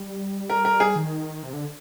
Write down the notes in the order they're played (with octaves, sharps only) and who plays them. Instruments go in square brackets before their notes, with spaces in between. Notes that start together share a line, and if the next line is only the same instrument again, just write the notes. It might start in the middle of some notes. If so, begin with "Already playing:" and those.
Already playing: [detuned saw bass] G3
[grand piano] A#4
A#4
G#4
[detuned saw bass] D#3
C3
D3